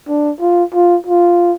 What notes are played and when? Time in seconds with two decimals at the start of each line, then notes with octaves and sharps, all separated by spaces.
0.09 D4
0.41 F4
0.74 F4
1.07 F4